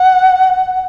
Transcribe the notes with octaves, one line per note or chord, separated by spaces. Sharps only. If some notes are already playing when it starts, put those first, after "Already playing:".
Already playing: F#5